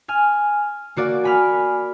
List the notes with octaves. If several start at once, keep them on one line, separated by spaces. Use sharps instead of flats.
G#5 F6
A#3 F#4 D5
G#5 B5 F6